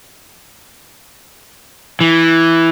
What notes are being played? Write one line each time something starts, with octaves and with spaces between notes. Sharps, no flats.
E3